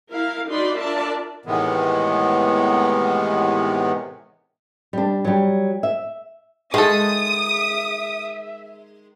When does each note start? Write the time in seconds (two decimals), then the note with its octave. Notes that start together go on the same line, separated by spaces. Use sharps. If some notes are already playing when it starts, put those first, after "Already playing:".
0.12 E4 A#4 F5
0.48 D4 D#4 F#4 D5 B5 C6
0.79 D4 F4 A#4 D5 E5 A5
1.46 A2 C3 D#3 E3 G#3 B3
4.93 G3 D4
5.25 F#3 G3
5.83 E5
6.74 D#3 G#3 A4 E5 D#6